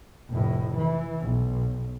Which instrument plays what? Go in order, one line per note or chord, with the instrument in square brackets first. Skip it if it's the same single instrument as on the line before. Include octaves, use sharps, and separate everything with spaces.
[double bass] F1 A2
E3
B1